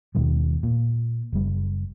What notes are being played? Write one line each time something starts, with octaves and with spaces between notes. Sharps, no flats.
D#2 B2 D#3 G3
A#2
F#1 G3